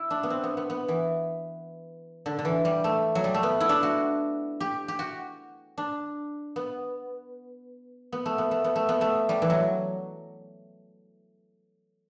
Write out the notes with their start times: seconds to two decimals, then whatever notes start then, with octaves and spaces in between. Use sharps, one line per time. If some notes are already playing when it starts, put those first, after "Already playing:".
Already playing: E4
0.10 D4
0.23 B3
0.30 C4
0.43 B3
0.57 B3
0.70 B3
0.88 E3
2.26 D3
2.39 D3
2.45 E3
2.65 G3
2.84 A3
3.15 F#3
3.24 G3
3.34 A3
3.43 B3
3.60 E4
3.69 D4
3.83 F#4
4.60 G4
4.88 G4
4.99 F#4
5.78 D4
6.56 B3
8.12 B3
8.26 A3
8.38 B3
8.51 A3
8.64 B3
8.76 A3
8.89 B3
9.01 A3
9.29 G3
9.42 E3
9.50 F#3